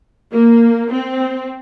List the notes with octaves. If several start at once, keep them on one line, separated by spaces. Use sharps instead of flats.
A#3
C4